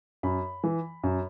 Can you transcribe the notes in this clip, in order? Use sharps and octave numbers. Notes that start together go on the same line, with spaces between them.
F#2 B5
E3
F#2